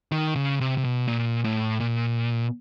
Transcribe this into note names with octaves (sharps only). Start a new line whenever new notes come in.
D#3
C#3
C3
C3
B2
A#2
A2
A#2